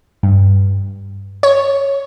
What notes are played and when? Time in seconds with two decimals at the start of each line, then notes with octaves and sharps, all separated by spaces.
0.23 G2
1.43 C#5